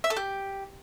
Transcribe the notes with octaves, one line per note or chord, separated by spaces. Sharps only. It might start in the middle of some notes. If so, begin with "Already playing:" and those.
E5
A4
G4